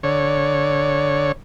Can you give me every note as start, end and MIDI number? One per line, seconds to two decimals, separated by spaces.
0.03 1.32 50
0.03 1.32 73